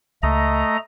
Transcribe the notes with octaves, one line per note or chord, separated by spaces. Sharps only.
C#2 A3 D#5 A#5